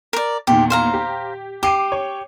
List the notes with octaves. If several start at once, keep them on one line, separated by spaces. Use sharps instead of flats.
A#4 D5
E2 A#2 D#3 G4
C5 F5 A#5
G4
G4 D6 C7 D#7
C#5